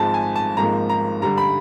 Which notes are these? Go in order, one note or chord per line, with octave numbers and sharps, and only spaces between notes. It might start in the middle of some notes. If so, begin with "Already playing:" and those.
Already playing: G#1 G#2 F3 A5
G#5
A5
G#1 G#2 F3 A#3 A#5
A#5
G2 D3 G3 A#5
B5